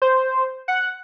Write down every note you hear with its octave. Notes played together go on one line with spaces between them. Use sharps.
C5
F#5